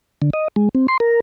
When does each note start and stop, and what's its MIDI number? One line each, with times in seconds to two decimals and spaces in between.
0.22 0.30 50
0.34 0.48 75
0.56 0.69 56
0.75 0.87 60
0.88 0.97 84
1.00 1.20 70